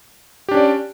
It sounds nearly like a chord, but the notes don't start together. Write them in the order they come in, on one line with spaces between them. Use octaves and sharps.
G4 D4 C#4 D5